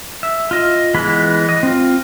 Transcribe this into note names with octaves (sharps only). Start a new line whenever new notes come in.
E5
F4 D#5
E3 G#3 B3 B5
D#5
C4 F4